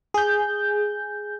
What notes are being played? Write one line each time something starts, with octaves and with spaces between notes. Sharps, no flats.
G#4 G6